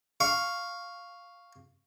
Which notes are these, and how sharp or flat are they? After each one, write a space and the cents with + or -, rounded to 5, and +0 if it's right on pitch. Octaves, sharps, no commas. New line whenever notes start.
F5 +0 C#6 +0